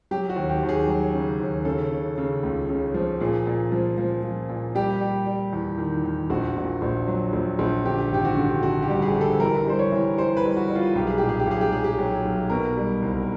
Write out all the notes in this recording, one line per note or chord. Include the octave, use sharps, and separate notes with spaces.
F#3 G4
F#4
D#2
G4
D#2
G#4
F#3
C#3
D#2
C#3 A4
C#3
C#3
C#2
C#3
F3
A#2 G#4
A#2
F3
F3
F3
A#2
G3 G4
G3
G3
E2
D#3
E2
A#1 F#4
A#2
A#1
F#3
A#1
A#1
D3 G4
G#1 G4
F#4
D3
D3 F#4
G4
G3
G#4
D3
A4
E3 A#4
G3 C5
C#5
E3
G3 C5
B4
G3
F#4
G3
F4
B1 G4
G#4
A#2 G4
G#4
G4
B1 G#4
G4
F#3 G#4
G4
F#3
B1
B2 A#4
G3
C2